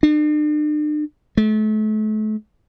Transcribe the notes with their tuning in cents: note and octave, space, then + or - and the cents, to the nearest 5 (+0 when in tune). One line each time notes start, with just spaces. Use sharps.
D4 +45
A3 -35